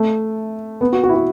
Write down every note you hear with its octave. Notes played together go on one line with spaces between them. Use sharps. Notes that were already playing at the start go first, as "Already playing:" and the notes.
Already playing: A3
B3
F#4
F#4
E4
F#4